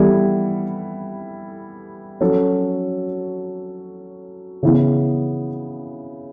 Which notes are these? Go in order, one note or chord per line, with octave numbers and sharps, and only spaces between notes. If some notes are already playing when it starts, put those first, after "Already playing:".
Already playing: E3 G3 B3 E4 A4
F#3 C#4 F#4 A4
C#3 E3 B3 E4